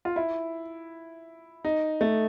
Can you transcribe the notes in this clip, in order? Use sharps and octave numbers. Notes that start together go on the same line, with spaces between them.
F4
E4
D#4
A3